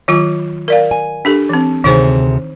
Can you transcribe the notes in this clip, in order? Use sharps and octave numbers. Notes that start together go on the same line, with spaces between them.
D#3 F#3 F4
A#4 D5 F5
G#5
D4 G4 A4
E3 C4
D2 C3 D#3 D#4 G#4 C5